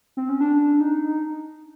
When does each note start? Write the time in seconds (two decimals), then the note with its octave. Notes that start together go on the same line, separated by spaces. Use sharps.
0.17 C4
0.29 C#4
0.41 D4
0.80 D#4